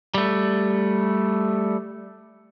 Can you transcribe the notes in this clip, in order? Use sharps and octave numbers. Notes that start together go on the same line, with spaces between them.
G3 A3